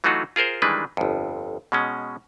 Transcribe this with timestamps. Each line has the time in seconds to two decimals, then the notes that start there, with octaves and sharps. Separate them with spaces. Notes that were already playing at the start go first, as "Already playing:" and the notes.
0.04 E3 F#3 A3 D#4 F4 F#4
0.36 F4 G#4 A#4 C5
0.62 D#3 E3 G3 G#3 D4 B4
0.97 G1 F2
1.72 B2 G#3 C#4